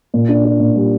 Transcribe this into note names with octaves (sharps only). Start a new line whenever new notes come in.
A#2
D4
D4
A#2
G3